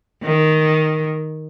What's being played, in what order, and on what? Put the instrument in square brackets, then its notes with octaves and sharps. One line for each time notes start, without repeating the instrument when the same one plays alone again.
[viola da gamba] D#3